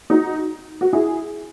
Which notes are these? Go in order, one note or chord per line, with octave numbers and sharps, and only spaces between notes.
D#4 F#4
F#4
E4 G#4